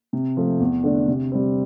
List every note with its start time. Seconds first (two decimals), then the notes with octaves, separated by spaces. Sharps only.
0.13 C3
0.37 F3 A3
0.60 E2
0.84 D3 A3 D4
1.08 C3
1.32 G3 C4